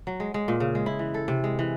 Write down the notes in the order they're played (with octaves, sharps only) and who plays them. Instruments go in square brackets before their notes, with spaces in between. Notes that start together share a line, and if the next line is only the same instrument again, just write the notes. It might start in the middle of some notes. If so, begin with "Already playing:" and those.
[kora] F#3
G#3
G#3
A#2
C#3
G#3
E4
E3
A4
C3
G#3
E3